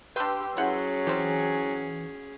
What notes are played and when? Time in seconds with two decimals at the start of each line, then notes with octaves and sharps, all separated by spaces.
0.16 D4 G4 B4 G5 C6 E6
0.57 F#3 C#4 E4 G#4 F#5 G5
1.07 C#3 E3 C4 G4